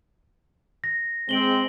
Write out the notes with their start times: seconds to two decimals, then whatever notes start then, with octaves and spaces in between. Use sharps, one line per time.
0.84 A#6
1.29 G#3 C4 D7 F#7 G7